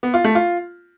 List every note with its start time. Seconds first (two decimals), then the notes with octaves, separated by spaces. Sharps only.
0.03 B3
0.14 F4
0.24 A3
0.35 F4